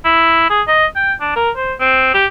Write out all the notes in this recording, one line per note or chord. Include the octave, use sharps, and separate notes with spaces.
E4
G#4
D#5
G5
D4
A#4
C5
C4
G4